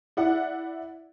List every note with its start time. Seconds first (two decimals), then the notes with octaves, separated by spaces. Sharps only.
0.17 E4 D5 F#5